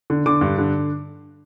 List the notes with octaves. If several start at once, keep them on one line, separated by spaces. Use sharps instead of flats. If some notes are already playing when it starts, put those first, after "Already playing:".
D3
D3 D6
G2
D3